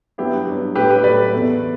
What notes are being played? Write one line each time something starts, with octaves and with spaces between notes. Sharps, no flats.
G2 F#3 B3 E4 G4
G2 F#3 B3
A2 F#3 A3 G4 B4
G4 B4
A2 F#3 A3 B4 D5
E2 B2 A3